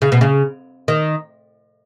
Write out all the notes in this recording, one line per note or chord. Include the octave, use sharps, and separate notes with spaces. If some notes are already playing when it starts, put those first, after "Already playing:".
C#3
B2
C#3
D#3